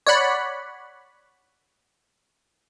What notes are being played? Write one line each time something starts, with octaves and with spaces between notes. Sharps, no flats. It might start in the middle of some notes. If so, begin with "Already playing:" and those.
C#5 D5 F#5 B5